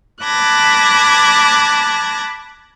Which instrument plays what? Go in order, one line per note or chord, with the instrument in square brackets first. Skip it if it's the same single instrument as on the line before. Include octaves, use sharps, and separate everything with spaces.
[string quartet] A5 B5 D6 F#6 G#6 A#6